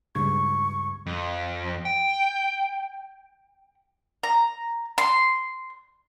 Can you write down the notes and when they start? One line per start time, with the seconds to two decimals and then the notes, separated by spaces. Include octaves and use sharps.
0.15 C#2 G2 C#6 G#6
1.06 F2
1.85 G5
4.23 A#5
4.98 C6